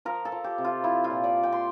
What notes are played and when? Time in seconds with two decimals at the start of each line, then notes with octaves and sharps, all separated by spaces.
0.05 F3 A#4
0.25 A4
0.32 F3
0.44 G4
0.58 C3
0.64 F4
0.84 F3 E4
1.04 F4
1.10 A#2
1.24 D5
1.37 F3
1.43 G5
1.52 C6